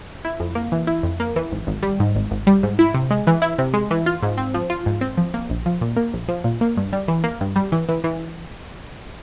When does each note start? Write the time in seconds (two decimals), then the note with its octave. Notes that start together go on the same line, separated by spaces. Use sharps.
0.25 E4
0.40 F2
0.55 A#3
0.72 E3
0.87 E4
1.03 F2
1.20 A#3
1.36 E3
1.52 G#1
1.67 G#1
1.83 G3
2.00 G#2
2.15 G#1
2.31 G#1
2.47 G3
2.63 G#2
2.79 E4
2.94 C3
3.11 G#3
3.27 E3
3.42 E4
3.58 C3
3.74 G#3
3.91 E3
4.06 F4
4.22 G#2
4.37 C4
4.54 F3
4.70 F4
4.86 G#2
5.01 C4
5.17 F3
5.34 A#3
5.50 A#1
5.66 F3
5.81 A#2
5.96 A#3
6.13 A#1
6.28 F3
6.44 A#2
6.61 A#3
6.77 G2
6.93 G3
7.08 E3
7.24 A#3
7.41 G2
7.56 G3
7.72 E3
7.89 E3
8.04 E3